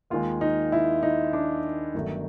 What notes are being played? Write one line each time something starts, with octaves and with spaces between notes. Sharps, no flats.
D#2 D#3 G#3 F4
D#4
E4
D#4
D4
G1 G2 D#3 F#3 A3